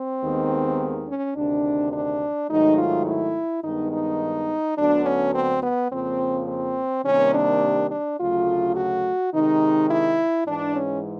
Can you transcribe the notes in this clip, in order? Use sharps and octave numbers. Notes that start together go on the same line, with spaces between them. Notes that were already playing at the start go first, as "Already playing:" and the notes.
Already playing: C4
D#2 D#3 G#3 B3
C#4
D2 C3 D#3 D4
D4
G#2 D#3 F#3 A3 D#4
F4
E4
G2 D#3 G#3 B3 D#4
D#4
D2 D3 F#3 B3 D4
C#4
C4
B3
F2 C#3 F3 A#3 C4
C4
C3 D#3 G3 A#3 C#4
D4
D4
D2 C#3 F#3 A3 F4
F#4
C3 D#3 G#3 D#4
E4
G#2 E3 G#3 D4
C#4